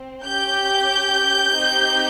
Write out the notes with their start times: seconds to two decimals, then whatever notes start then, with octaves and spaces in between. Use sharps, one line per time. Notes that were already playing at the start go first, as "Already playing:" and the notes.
Already playing: C4
0.24 C#4 G4 G6
1.55 C4 D#4 G4